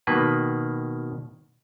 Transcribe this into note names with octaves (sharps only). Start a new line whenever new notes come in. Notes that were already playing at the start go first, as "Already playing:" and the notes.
B2 D#3 A#3 B4